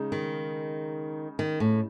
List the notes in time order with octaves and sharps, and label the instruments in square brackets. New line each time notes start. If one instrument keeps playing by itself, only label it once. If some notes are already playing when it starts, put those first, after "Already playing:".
Already playing: [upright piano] C#3 G#3 D#4
[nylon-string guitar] D#3
D#3
A2